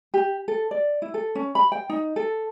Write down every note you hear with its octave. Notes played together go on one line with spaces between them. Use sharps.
G4
A4
D5
E4
A4
C#4
B5
G5
D#4
A4